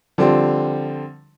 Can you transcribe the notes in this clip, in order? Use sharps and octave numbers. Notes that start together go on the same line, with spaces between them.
D3 F3 G3 C4